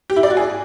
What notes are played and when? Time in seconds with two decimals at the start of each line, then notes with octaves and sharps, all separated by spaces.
0.10 G4
0.16 E4
0.23 D5
0.30 F#4
0.37 G#4